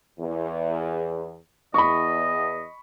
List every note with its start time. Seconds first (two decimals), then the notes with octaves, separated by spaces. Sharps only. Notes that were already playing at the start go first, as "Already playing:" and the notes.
0.19 E2
1.74 E2 D#5 B5 C#6